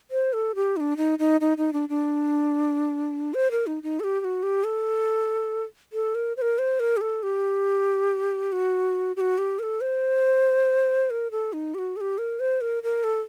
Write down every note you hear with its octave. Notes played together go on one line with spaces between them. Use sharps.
C5
A4
G4
D#4
D4
D#4
D#4
D#4
D#4
D4
D4
C5
A#4
D#4
D#4
A4
G4
G4
F#4
G4
A4
A4
A#4
C5
A#4
C5
A#4
G4
A4
G4
F#4
G4
F#4
G4
A#4
A4
C5
A#4
A4
D#4
G4
F#4
A4
G4
A#4
C5
A#4
A#4
A4